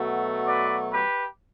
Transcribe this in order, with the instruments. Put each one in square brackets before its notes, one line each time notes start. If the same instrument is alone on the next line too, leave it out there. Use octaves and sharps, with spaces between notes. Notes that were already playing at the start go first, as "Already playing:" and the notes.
Already playing: [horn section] B2 F#3 A3
B4 D5
G4 B4